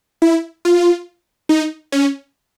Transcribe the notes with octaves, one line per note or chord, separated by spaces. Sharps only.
E4
F4
D#4
C#4